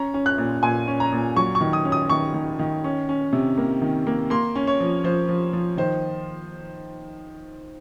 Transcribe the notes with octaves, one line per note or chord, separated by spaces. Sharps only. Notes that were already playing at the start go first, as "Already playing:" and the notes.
Already playing: C#4 A#5
C#4
F#6
A#2
A#2 G#5
C#4
A#5
A#2
F#3 C#6
C#6
D#3
D#6
C#4
D#6
D#3 C#6
D#3
D#3
C#4
C#4
C3
A#3
D#3
A#3
A#3 C6
C#4
C#5
F3
F3 C5
F3
F3
D#3 C5